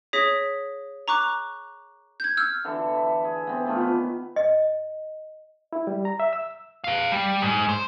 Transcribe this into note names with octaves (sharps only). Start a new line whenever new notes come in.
G#4 C#5 D#6 A#6 B6
A#5 C#6 D6 F#6
G6 G#6
E6 F6
D3 E3 A4
E5
G#4
B3 C4
A#2 D#3 F3 A3
B3 B4
D#5
E4
G3
A#5
E5
E6
B4 F5
G3
G#2
C5